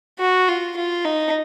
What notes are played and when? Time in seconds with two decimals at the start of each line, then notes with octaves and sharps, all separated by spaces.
0.19 F#4
0.48 F4
0.77 F4
1.05 D#4